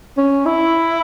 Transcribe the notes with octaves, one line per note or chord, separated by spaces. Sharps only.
C#4
E4